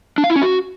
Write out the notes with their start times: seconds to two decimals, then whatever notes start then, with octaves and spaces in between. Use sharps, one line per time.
0.18 D4
0.24 F5
0.30 E4
0.36 C#4
0.42 F#4